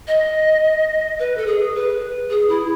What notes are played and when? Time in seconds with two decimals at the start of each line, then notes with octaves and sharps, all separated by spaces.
0.08 D#5
1.19 B4
1.37 A4
1.47 G#4
1.75 B4
2.30 G#4
2.49 E4